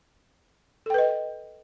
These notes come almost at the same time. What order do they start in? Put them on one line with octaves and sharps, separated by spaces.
A4 G5 B4 D#5